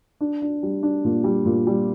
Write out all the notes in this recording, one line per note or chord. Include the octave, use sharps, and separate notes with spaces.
D4
D4
G3
D4
A#2
G3
A#2
G3